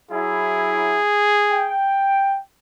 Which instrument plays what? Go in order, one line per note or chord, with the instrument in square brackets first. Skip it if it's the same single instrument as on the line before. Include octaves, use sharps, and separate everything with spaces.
[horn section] F#3 E4 [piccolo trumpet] G#4
[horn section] G5